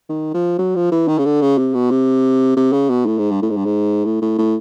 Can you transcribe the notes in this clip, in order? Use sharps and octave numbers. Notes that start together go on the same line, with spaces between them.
D#3
F3
F#3
F3
E3
D#3
C#3
D3
C#3
C3
B2
C3
C3
C#3
B2
A2
G#2
G2
A2
G#2
G2
G#2
A2
A2
A2